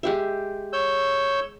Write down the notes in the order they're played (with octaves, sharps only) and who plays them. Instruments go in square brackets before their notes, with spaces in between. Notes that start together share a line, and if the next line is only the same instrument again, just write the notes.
[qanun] G#3 G4 E5
[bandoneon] C#5 E6 G6